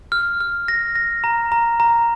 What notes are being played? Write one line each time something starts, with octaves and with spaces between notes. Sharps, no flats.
F6
F6
A#6
A#6
A#5
A#5
A#5